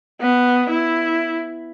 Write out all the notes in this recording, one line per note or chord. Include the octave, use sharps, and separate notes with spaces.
B3
E4